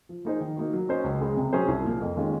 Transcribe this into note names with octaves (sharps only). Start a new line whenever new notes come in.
F3
A#3 D#4 G#4 C5
D#3
A#3 D#4 F#4
F#3
C#4 F#4 C5 D#5
C#2
C#3 G#3
C3
F#3 C#4 G#4 C5
C2
A#2 F3 A#3
F2
D#3 G#3 C#4 F4